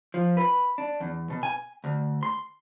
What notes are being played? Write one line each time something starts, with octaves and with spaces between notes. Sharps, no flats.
F3
B4
D4
E2
B2
G#5
D2
C6